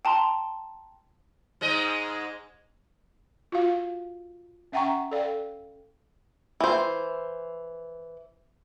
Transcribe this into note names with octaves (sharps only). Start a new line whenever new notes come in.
G5 A5 A#5 C6
G#2 G#3 D#5
F4 F#4 F5
C#4 E5 F#5 G5 A#5 C#6
A4 D5 F5 G5
E3 C5